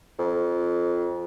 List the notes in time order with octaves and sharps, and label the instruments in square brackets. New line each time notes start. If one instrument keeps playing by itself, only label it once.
[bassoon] F2